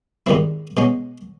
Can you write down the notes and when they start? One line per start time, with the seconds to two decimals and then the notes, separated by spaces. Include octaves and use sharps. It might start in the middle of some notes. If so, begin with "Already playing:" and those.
0.26 G#2 D#3 G3 C4 E4
0.77 B2 G#3 C#4